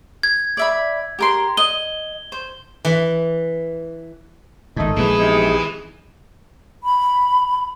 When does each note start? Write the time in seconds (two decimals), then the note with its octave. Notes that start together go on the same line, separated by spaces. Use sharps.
0.23 G#6
0.57 D5 E5 B5
1.19 G4 A#4 C6
1.57 D#5 G7
2.32 C5
2.85 E3
4.76 G#1 G#2 A3 D#4
4.96 A#1 E3 G#3 B3 E4 G#4
5.18 C3 D#4
6.84 B5